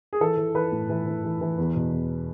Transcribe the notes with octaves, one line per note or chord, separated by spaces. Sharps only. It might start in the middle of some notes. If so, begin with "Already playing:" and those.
G#4
E3 A4
E3
E3 B4
A2
E3
E3
E3
E3
E2
B2
E2